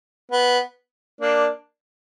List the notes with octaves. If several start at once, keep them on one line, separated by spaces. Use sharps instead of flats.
B3
A#3 D4